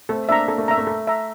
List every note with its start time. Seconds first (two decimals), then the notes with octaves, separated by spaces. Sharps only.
0.09 A3 C4 A4
0.29 A#3 D4 E5 A#5
0.48 A#3 A4
0.58 A3
0.67 A#3 E5 A#5
0.77 A3
0.87 A4
1.07 E5 A#5